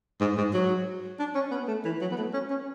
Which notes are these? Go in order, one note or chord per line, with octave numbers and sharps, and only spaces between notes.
G#2
G#2
F#3
D4
C#4
B3
A3
E3
F#3
B3
A3
C#4
C#4